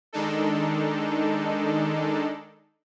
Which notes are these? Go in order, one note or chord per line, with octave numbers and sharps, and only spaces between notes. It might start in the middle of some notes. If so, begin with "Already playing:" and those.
D#3 G#3 D4 D#4 A4